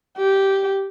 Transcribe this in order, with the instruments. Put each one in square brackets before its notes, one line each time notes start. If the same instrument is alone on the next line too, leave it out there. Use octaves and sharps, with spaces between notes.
[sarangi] G4